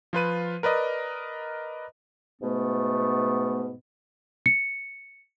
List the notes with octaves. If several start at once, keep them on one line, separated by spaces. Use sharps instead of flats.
F3 F4 B4 D#7
A#4 B4 D5 D#5
G#2 B2 A3 B3
C#7